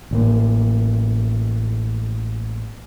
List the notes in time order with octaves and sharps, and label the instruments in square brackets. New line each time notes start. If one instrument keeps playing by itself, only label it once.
[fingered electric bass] A1 A2 A#3